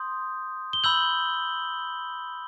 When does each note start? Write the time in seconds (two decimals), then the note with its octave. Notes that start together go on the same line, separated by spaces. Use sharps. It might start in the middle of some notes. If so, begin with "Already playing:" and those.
Already playing: C6 D#6 G6
0.73 G7
0.84 B5 E6 G6 F#7